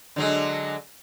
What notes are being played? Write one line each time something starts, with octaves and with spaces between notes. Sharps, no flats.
D3 F#3 G#3